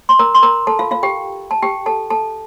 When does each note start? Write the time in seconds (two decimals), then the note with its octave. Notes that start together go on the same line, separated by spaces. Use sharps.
0.09 C6
0.19 A#4 A#5
0.35 C6
0.43 A#4 A#5
0.67 A4 A5
0.79 F4 F5
0.91 F4 F5
1.03 G4 G5
1.51 A5
1.62 G4 G5
1.86 A4 A5
2.10 A4 A5